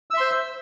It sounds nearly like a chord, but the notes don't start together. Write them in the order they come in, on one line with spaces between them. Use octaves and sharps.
E6 E5 C6 C5